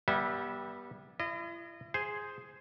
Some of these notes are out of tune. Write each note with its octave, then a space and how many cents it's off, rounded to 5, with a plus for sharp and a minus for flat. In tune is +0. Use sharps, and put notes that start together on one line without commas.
G3 +0 B3 -35 E5 -15
E4 +40 D#5 -25
G#4 +0 C5 +0